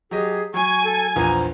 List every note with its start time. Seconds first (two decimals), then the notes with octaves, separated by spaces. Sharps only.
0.11 F#3 G4 G#4 D#5
0.54 F#3 G#5 C#6
0.84 A4
1.16 A#1 E2 F3 A#5